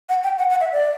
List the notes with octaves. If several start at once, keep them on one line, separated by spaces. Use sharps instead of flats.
F#5
G5
F#5
F#5
E5
D5